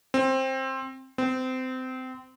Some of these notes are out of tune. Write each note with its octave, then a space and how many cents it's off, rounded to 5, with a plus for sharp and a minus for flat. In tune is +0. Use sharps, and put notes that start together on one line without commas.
C4 +15
C4 -25